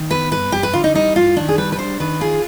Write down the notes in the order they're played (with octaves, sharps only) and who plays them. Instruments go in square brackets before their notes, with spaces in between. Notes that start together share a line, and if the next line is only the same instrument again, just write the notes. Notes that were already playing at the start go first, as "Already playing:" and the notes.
Already playing: [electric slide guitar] D#3
[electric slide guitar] B3 [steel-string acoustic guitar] B4
[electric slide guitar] G2 [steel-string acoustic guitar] B4
[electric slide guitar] G2 [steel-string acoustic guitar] G4
[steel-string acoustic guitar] B4
[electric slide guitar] D3 [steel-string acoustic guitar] F4
[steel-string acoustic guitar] D#4
[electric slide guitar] G3 [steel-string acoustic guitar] D#4
[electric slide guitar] G2 [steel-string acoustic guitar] F4
[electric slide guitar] D#3 [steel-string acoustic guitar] D4
[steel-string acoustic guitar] G#4
[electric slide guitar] G3 [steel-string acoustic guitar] B4
[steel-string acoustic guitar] B4
[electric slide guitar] D4 [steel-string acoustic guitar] C5
[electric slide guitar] D#3 [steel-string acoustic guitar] B4
[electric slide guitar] F4 [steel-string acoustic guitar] G#4